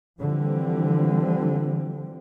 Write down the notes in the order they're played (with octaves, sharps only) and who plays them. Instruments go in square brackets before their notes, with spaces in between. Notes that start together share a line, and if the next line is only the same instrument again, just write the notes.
[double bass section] D3 E3 F3 G3 C4